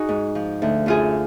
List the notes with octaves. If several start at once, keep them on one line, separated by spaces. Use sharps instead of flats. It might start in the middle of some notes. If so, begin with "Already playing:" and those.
Already playing: D#4 F#4 G#4
G#2
F3
D2
F#2 F4 G#4